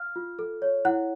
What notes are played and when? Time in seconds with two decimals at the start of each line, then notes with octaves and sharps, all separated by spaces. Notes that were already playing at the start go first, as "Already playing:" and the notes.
Already playing: F5 F6
0.16 F4
0.39 A4
0.62 C#5
0.85 E4 F#5 F#6